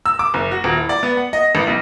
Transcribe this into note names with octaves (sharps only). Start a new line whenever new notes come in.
E6
D6
F#1
F#4
D#1
E4
D5
B3
F#5
D#5
A1
B1